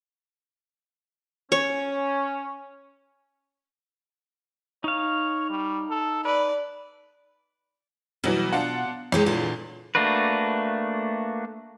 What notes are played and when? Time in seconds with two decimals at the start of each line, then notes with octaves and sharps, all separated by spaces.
1.52 C#4 C#5
4.84 D#4 C#5 F5
5.50 G3
5.90 A4
6.25 B4 D5
8.24 B2 E3 F#3 G3
8.53 D4 F4 F#5
9.12 E2 G#3 G4 C#5
9.26 A#2 D3 F4
9.95 A3 A#3 D4 F#4 B4